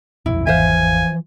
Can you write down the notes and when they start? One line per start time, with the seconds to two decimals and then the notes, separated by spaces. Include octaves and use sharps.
0.26 D#1 B1 F2 E4
0.47 G#1 E2 E3 F3 C5 E5 F5 G#5